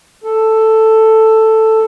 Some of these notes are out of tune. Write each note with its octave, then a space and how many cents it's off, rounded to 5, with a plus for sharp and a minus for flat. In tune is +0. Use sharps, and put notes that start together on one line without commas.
A4 +5